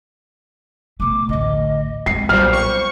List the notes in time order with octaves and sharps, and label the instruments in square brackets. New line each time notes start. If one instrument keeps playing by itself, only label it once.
[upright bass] B2 A3 [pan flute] D6
[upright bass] A1 D2 [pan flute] D#5
[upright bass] G#3 C4 [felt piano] C7
[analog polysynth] B1 A#2 G3 [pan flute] C5 [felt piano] F6
[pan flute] C5 [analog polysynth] C#6